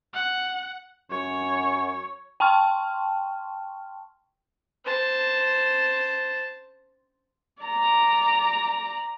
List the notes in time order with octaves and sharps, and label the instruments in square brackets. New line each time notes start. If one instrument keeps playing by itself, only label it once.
[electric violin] F#5
[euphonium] F#2 [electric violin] C#5
[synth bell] G5 A5 C6 C#6 F6
[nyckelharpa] C5 A5
[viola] D5 A#5